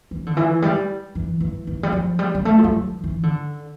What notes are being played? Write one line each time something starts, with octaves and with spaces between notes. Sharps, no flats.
E3
D3
E3
G3
E3
E3
E3
G3
F3
G3
G3
A3
F3
G3
E3
E3
D3